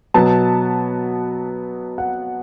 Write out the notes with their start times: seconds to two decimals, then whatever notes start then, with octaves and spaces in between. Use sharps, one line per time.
0.14 B2 F#3 B3 A5
1.98 F#5